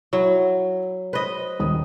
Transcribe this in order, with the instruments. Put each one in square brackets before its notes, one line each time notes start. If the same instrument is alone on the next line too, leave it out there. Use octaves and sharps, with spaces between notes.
[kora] F#3 [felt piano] E4
[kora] B4 D#5 [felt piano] C5
[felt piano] D#1 D#3 D#6